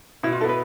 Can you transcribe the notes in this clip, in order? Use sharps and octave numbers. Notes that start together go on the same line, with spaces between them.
B2 E4
F4
B3 E4 A4 B4